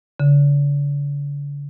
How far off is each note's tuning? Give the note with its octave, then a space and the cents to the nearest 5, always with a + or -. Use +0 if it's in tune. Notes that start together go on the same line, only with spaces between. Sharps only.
D3 -45